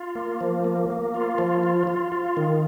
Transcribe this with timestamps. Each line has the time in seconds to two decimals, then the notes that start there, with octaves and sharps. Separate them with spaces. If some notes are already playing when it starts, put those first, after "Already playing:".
Already playing: F4
0.15 A#3
0.41 F3
0.64 A#3
0.90 A#3
1.14 F4
1.38 F3
1.63 F4
1.87 F4
2.12 F4
2.37 D#3